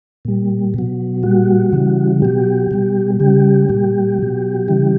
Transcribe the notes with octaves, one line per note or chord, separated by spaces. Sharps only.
A#2 G3
B2 F#3
A#2 G3 F#4
C#3 E3 G3
B2 F#3 G4
B2 G3
C#3 G3 G4
A#2 G3
B2 F#3
C#3 E3 G3